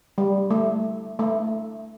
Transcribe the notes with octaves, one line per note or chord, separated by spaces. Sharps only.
G3
A3
A3